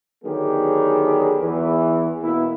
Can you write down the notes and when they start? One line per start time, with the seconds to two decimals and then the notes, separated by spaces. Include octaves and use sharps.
0.24 D3 D#3 F#3 B3 G4 G#4
1.41 E2 E3
2.23 B2 A#3 B3 E4